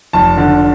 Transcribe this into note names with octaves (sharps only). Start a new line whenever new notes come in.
F1 A5
D3